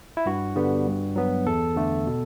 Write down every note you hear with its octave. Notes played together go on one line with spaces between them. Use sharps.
E4
G2 F#4
D3 G3 B3
G2
F#3 B3
E2 A4
D3 A3
B2